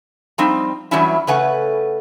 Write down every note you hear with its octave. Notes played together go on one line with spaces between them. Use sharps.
F3 G3 C4 D#4
E3 F#3 G3 C#4 E4
C#3 A3 C#4 B4 F#5 G#5